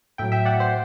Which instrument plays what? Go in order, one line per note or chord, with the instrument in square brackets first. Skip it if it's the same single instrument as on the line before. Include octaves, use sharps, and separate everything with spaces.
[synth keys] A2 E5 G5
F#3
E5 G5
D5 F#5
C5 E5